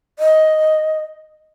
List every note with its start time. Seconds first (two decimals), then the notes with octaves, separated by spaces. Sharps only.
0.19 D#5